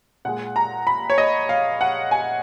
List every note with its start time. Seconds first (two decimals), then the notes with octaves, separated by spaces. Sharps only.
0.25 A#2 G#3 F#5
0.56 A#5
0.87 B5
1.10 C#5
1.18 D#5
1.49 F5
1.81 F#5
2.11 G#5